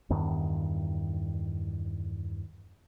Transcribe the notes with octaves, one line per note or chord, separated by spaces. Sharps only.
E2 G2 D#3